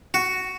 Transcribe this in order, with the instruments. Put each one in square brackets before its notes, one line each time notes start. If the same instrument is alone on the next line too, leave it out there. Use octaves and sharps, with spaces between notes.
[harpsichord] F#4